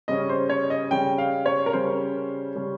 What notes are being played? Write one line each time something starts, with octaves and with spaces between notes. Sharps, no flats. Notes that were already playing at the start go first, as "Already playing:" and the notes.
C#3 G3 C#4 D#5
C5
C#5
D#5
C#3 G3 C#4 G5
F5
C#5
A#4
C#3 G3 C#4 C5
C#3 G3 C#4